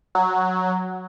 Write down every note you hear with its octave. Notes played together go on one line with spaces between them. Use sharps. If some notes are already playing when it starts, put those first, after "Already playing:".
F#3